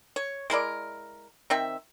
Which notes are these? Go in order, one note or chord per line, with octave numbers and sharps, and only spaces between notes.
C#5
G#3 E4 A#4 D5
D#3 C4 E5